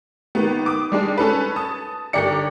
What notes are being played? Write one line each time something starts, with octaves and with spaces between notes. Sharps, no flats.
D#3 A#3 B3
D6 D#6
G3 G#3 D4
C#4 A4 B4
A5 D#6
G1 G4 A#4 D5 C#7